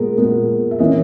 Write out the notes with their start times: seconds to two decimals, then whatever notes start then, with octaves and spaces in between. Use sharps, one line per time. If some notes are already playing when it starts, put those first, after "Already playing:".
Already playing: A#2 G#3 B3 G#4 A#4
0.17 A#2 G#3 B3
0.71 E5
0.79 E3 A#3 C#4 D#5